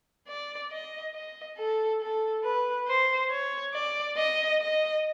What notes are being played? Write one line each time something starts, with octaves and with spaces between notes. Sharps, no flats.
D5
D#5
D#5
A4
A4
B4
C5
C#5
D5
D#5
D#5